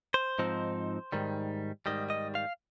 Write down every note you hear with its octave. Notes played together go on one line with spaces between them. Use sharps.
C5
G#2 F3 C4 D#4
G#2 D#3 G3
G#2 D#3 G3 D#5
D#5
F5